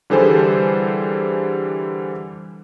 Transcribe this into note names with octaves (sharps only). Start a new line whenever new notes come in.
D3 E3 G3 G#4 A4 C5